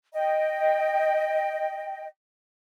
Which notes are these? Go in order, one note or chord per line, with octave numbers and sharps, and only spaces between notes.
D#5 G5